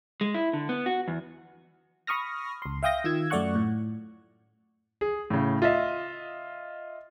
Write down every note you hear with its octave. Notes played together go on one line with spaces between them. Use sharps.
G#3
E4
D3
B3
F#4
E2
B5 C#6 D#6 F6 A#6
C#2 C6
E5 F5 G5 D#6 G6 A#6
D#3 F4 E6 G#6
F#2 A3 D5 F#5 C#6 F#6
A2
G#4
A2 C#3
F4 D#5 E5